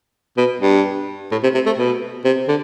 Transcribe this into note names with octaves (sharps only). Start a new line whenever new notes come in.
B2
G2
A2
C3
C3
A3
B2
C3
D3